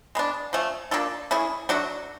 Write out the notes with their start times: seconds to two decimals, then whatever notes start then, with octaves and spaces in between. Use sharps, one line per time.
0.15 G#3 B3 D4
0.53 F3 A3 C#4
0.91 A#3 D4 F4 A4
1.31 A3 C#4 E4 G#4
1.69 F#3 A3 D4 F#4